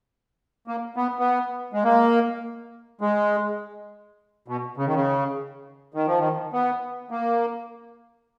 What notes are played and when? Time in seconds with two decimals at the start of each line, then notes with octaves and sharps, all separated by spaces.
0.67 A#3
0.96 B3
1.19 B3
1.73 G#3
1.84 A#3
3.01 G#3
4.48 B2
4.77 C#3
4.86 D#3
4.94 C#3
5.94 D#3
6.07 F3
6.19 D#3
6.53 B3
7.11 A#3